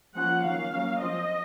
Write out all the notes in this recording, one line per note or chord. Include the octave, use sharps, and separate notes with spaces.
F3 A#3 C#4 F#5
D#3 F#3 A#3 C#4 F5
F#3 A#3 C#4
F3 C4 D#5